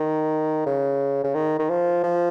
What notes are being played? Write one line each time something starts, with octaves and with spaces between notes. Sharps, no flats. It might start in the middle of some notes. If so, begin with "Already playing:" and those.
Already playing: D#3
C#3
C#3
D#3
D#3
F3
F3